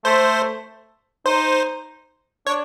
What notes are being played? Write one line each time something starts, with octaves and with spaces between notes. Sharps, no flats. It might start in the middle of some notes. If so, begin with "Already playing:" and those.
A3 C5
D#4 C5
D4 C#5